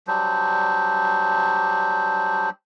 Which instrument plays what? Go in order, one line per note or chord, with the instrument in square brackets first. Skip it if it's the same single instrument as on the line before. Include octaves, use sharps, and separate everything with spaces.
[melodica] F#3 G3 D4 C5